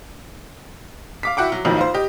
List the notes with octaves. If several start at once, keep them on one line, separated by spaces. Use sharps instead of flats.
F5 D6 B6
E4 F#4 F#5 G5 D6
F#3
A1 F2 A2 D#3 F3 F#3
F4 C5
G4 D#5